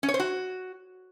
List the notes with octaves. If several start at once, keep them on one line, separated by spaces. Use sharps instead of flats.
C#4
C#5
C5
F#4